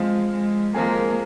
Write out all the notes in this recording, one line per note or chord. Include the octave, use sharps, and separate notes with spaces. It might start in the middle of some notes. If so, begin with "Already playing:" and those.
Already playing: F3 G#3 C4 F4
G#3
F3 G#3 A#3 C4 F4 G#4